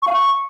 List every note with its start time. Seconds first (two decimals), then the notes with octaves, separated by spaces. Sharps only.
0.02 C#6
0.07 F5
0.12 C#6